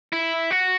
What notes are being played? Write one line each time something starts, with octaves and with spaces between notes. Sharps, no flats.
E4
F#4